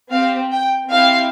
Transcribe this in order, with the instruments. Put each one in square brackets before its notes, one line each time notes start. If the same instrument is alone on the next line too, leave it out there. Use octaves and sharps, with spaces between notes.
[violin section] C4 G4 F5
G5
C4 E4 G4 F5